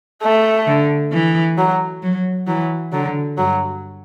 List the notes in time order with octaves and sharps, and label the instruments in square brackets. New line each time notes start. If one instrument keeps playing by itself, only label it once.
[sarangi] A3
[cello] D3
E3
[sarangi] F#3
[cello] F#3
[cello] E3 [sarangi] F#3
[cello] D3 [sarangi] F#3
[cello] G2 [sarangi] F#3